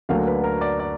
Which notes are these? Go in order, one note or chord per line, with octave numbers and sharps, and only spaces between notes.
D2 D3 F#3 A#3 F5
B4
A#4
D5
D5